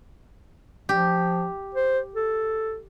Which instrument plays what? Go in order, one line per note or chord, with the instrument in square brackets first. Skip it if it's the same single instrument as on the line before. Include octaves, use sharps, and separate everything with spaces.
[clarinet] F3 [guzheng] G4
[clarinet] C5
A4